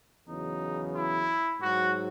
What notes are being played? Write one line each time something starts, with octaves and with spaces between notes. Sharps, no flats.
E2 C#3 F#3 D#4
E4
G#2 F#3 F#4